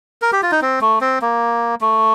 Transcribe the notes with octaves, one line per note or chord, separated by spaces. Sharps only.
A#4
G4
F4
D#4
C4
A3
C4
A#3
A3